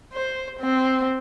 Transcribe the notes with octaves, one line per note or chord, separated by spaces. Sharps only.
C5
C4